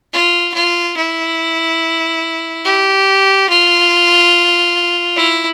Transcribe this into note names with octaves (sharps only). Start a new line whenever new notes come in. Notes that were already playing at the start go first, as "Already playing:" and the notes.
F4
F4
E4
G4
F4
E4